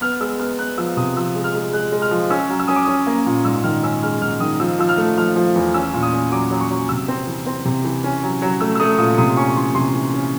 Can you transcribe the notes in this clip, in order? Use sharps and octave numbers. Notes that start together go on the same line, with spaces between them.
B3 F6
G#3 E6
B3 F6
B3 F#6
F3 E6
C3 D#6
F3 E6
G#3
F6
G#3
G#3 F#6
G#3
F6
F3
C#4 E6
F#3
E6
C#4 D#6
D6
C#4 D#6
A#3
A#2
G#2 E6
D#3 F6
C#4 E6
G#3 F6
G#2 F6
D#3 D#6
F3 E6
F3 E6
F6
A3
F3 F6
F3
E2
C#4 E6
A#2
D#6
C#4
F#3 D6
F#3
C#6
F#3
C3 E6
C4
E3
C4
C3
E3
C#4
F#3
F#3
A3 E6
E6
A3 D#6
A#2 D#6
C3 D#6
C#4 C#6
E3 C6
C3 C6
E3
C#4